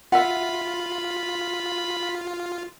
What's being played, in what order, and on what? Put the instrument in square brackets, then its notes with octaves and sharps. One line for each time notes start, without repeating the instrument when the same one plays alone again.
[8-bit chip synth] F4 [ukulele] E5 F#5 [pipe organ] B5